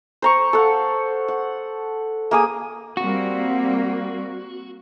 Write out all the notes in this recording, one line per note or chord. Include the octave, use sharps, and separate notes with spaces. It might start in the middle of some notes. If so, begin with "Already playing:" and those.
C5 A#5 C#6
A4 F5 F#5
F#5
A#3 G#4 D#6
G3 A#3 C4 F#4